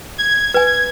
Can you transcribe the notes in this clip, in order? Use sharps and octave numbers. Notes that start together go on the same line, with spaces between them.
G#6
B4 G#5